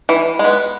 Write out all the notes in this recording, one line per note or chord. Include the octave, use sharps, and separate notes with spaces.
E3
G#3 B3